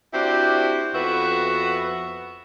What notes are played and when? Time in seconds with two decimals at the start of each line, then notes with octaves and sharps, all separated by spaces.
0.13 C4 D4 E4 F#4 G4
0.94 F2 B3 F#4 B4 E5